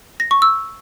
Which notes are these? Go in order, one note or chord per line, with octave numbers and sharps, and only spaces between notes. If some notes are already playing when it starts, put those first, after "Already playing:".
A#6
C#6
E6